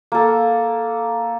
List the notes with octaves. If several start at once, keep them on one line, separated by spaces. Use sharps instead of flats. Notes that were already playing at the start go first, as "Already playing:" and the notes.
A#3 A4